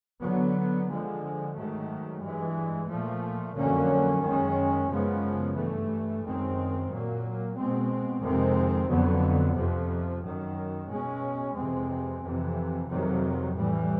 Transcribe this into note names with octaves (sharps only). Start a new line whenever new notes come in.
D3 F#3 B3
D3 F3 G#3
G#2 D#3 F#3 A3
G2 E3 G#3
A#2 F3 A3
F2 D3 F#3 A#3 C#4
F#2 D#3 G#3 C#4
F#2 C#3 F3 G#3 B3
G2 E3 A3
F#2 D#3 G#3 C4
A#2 F#3 A#3
B2 G#3 C4
F2 C3 D#3 G#3 C4
F2 D3 F#3 B3
F2 C3 F3
F#2 D#3 F#3
B2 G#3 C#4
F2 C3 E3 G#3 C4
F2 C3 E3
F2 C3 D#3 F#3
A2 E3 G3